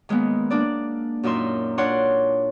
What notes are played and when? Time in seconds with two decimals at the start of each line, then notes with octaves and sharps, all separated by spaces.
0.09 D#3 G#3 A#3 B3
0.50 A#3 D4 D5
1.23 F#2 A#2 D#4 E5 C6
1.78 D4 F4 C#5 D5 F#5 C6